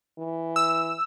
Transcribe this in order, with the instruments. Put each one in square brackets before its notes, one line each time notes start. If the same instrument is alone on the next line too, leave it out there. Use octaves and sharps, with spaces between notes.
[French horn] E3
[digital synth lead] E6